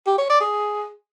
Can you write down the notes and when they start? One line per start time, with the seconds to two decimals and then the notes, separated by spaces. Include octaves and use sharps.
0.07 G4
0.18 C#5
0.29 D5
0.41 G#4